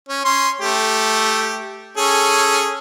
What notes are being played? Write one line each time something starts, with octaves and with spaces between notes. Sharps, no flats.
C#4
C#4 C6
A3 G4
C#4 G#4 A4